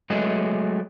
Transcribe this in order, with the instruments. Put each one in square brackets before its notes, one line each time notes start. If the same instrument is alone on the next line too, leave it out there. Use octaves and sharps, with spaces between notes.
[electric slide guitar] F#3 G#3 A3 G#4 B4 D#5